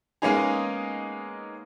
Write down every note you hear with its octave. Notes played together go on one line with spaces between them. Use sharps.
G#3 A#3 B3 C#4 D#4 G#4